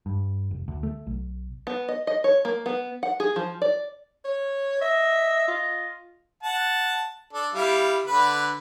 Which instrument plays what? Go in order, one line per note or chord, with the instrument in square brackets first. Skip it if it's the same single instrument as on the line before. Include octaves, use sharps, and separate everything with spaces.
[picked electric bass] G2
F1
D2
A3
B1
[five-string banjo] B3
D#5
D#5
C#5
A#3
B3
F#5
G#4
F3
D5
[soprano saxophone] C#5
[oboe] D#5 [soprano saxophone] E5
[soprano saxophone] F4
[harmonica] F#5 A5
D4 A4
G3 E4 F5
D3 B4 B5